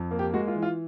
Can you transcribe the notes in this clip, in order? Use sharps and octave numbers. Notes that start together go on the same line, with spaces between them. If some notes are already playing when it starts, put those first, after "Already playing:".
Already playing: F2
A#3
G4
G#3 F#4
F4
E3
F4